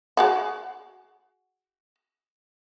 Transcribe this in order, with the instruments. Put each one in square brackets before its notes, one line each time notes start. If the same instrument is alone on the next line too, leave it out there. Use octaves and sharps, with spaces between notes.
[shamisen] F#4 G#4 F#5